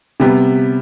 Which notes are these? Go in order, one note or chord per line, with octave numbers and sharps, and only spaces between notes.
C3 G3 B3